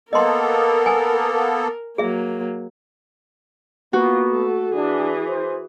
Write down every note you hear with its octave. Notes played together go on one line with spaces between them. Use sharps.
A#3 B3 A4 A#4 D#5 C6
G#5
F#3 A#3 G#4 E5
A#3 B3 F4 F#4
A3 A4
E3 D4 G#4
C5